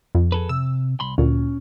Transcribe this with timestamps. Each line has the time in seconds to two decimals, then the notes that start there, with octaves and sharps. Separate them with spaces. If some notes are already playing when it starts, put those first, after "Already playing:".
0.15 F2
0.32 G#4 A4 B4
0.49 C3 E6
1.00 C2 B5 C6
1.18 D2 A#2 C#4